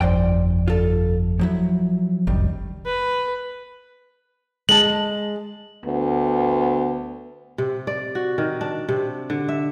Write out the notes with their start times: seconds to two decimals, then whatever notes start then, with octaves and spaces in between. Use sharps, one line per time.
0.01 G1 F2 C5 D5 G5
0.68 F4 A4
1.39 F3 F#3 E4
2.27 G1 C#2 F#2 D#3 G3
2.85 B4
4.69 G#3 A5 F#7
5.85 D2 B3
7.58 C3
7.87 D5
8.15 F#4
8.38 D#3
8.61 D4
8.89 C3
9.30 D3
9.49 E5